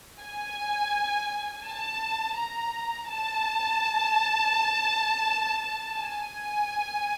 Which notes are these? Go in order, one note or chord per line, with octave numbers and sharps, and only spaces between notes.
G#5
A5
A#5
A5
G#5